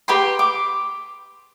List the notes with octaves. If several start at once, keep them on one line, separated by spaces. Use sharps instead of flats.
G4 B4 G5 C6
D6